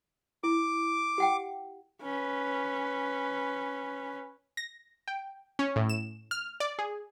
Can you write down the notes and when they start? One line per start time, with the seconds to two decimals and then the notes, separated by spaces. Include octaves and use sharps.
0.44 E4 D6
1.18 G4 F#5 G5
2.01 C#4 B4
4.57 A#6
5.08 G5
5.59 C#4
5.76 A2
5.89 E7
6.31 F6
6.60 D5
6.79 G#4